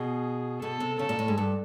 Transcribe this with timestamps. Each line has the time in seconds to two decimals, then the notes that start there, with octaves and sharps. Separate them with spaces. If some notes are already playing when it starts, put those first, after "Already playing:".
Already playing: B2 G#4
0.62 B2 A4
0.80 C3
0.99 C#3 A4
1.09 A#2
1.19 A2
1.28 G#2
1.38 G2